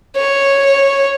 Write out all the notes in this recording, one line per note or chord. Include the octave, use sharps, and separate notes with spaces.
C#5